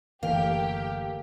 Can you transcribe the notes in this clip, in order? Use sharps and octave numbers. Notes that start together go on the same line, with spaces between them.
F#1 D3 E3 A3 A#3 G4 F5